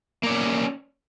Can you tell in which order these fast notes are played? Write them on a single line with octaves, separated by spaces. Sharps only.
A#3 D5 C#4